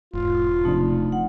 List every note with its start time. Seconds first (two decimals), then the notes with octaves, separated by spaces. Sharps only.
0.14 E1 G#2 F4
0.65 C3 F3 A3 D4 D#4
1.12 F#5